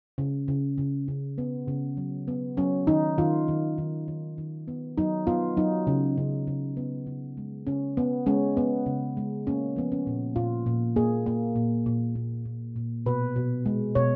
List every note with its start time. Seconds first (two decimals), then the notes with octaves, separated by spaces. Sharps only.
0.18 C#3
0.48 C#3
0.78 C#3
1.08 C#3
1.38 B3
1.68 C#3
1.97 F#3
2.28 B3
2.57 F#3 C#4
2.87 D#3 D#4
3.18 D#3 F4
3.48 D#3
3.78 D#3
4.08 D#3
4.38 D#3
4.68 B3
4.98 F#3 D#4
5.27 B3 F4
5.57 F#3 D#4
5.87 C#3
6.18 C#3
6.47 C#3
6.77 B3
7.07 C#3
7.37 G#3
7.67 C#3 C#4
7.97 B3
8.26 G#3 C#4
8.57 B3
8.86 C#3
9.17 G#3
9.47 A#3 C#4
9.76 F3 B3
9.92 C#4
10.07 A#2
10.36 A#2 F4
10.66 A#2
10.96 A#3 G#4
11.26 A#3
11.56 A#2
11.86 A#2
12.15 A#2
12.45 A#2
12.76 A#2
13.06 B2 B4
13.36 B2
13.66 G#3
13.95 B2 C#5